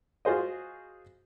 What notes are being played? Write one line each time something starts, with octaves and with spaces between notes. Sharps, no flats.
F4 F#4 G#4 C5 D#5